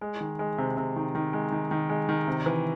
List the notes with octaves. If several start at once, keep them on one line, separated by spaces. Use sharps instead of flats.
G#3
D#3
G#3
C3
C3
D#3
D#3
G#3
D#3
D#3
G#3
D#3
C3
E3